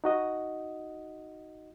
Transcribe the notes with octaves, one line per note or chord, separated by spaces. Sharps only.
D#4 F#4 D#5